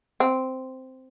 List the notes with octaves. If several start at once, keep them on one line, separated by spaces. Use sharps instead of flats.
C4